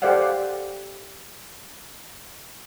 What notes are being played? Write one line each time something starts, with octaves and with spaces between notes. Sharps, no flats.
G4 A4 C5 D5 F5 F#5